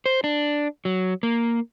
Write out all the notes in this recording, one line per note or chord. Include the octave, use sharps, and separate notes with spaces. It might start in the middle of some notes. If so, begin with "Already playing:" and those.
C5
D4
F#3
A#3